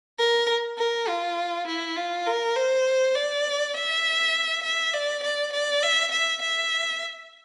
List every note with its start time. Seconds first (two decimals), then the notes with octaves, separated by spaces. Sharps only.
0.19 A#4
0.78 A#4
1.08 F4
1.67 E4
1.97 F4
2.27 A#4
2.56 C5
3.16 D5
3.75 E5
4.63 E5
4.94 D5
5.23 D5
5.53 D5
5.83 E5
6.12 E5
6.42 E5